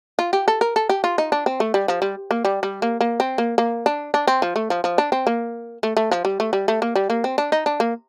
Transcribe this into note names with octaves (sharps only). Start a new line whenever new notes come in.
F4
G4
A4
A#4
A4
G4
F4
D#4
D4
C4
A3
G3
F3
G3
A#3
G3
G3
A#3
A#3
C4
A#3
A#3
D4
D4
C4
F3
A3
F3
F3
D4
C4
A#3
A3
A3
F3
G3
A3
G3
A3
A#3
G3
A#3
C4
D4
D#4
D4
A#3